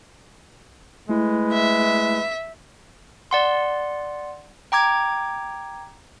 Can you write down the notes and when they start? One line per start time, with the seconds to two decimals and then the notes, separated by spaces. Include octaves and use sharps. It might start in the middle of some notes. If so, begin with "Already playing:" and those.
1.09 G#3 A3 E4 B4
1.53 E5
3.31 D5 F#5 C6
4.72 G5 A#5 D6 G#6